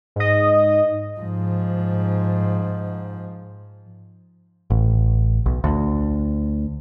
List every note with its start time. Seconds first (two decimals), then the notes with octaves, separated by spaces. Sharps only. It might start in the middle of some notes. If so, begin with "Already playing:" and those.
0.16 G#2 D#5
1.20 G#2 F3
4.70 A1
5.46 B1
5.64 D2